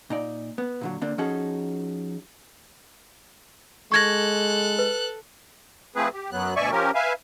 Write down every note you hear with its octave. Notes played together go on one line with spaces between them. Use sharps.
A#2 D#4 D5
B3
A#2 D3 F#3
D3 A#3 C4 D4
F3 C#4 D#4 F#4 G#4 A4
G#3 A4 C#6 F#6 G#6 A#6
B4
F3 A3 C4 G#4 B4
G4
F#2 F#3 B3 F#6
D2 B2 D5 E5 G#5 C#6
F3 C#4 G4 A#4
B4 E5 F5 G#5